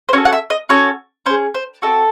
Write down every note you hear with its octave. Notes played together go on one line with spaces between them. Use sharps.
C5
C#4 F#4 A4 C#5
F#5
E5
D#5
C#4 F#4 A4 C#5
C#4 G#4 C5
C5
C4 D#4 F#4 A4